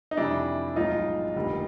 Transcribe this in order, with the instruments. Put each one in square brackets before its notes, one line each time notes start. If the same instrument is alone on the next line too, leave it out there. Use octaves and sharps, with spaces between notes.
[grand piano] D#4
F2 C3 E3 G3 D4 E4
B1 A2 F3 G#3 D#4 F4
F1 D#2 D3 G3